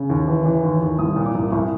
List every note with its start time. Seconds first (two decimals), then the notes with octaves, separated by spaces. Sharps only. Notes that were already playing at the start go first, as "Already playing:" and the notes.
Already playing: C#3
0.10 D#2
0.28 E3
0.46 E3
0.63 D#2
0.81 D#2
0.98 C2 D#6
1.16 A#2
1.26 D6
1.34 C2
1.52 C2 C#6